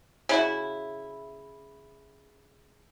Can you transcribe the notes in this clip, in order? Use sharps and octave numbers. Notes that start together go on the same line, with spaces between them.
C#3 E4 F#4